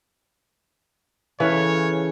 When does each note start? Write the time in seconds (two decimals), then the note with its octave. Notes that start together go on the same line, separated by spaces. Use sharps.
1.40 C#3 E3 A4 C#5 F5